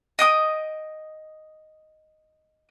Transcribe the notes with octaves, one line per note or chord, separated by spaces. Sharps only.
D#5 G5 D#6